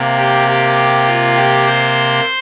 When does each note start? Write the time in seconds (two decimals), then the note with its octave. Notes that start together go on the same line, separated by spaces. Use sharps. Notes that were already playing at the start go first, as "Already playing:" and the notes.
Already playing: C3 A#3
0.18 G4
0.48 G4
1.07 F4
1.37 G4
1.66 C5